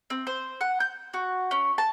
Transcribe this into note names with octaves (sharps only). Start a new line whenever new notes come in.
C4
C5
F#5
G6
F#4
C#4
A5